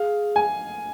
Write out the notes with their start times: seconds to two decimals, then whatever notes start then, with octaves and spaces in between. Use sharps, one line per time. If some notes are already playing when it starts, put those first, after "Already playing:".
Already playing: G#4 F5
0.36 G#5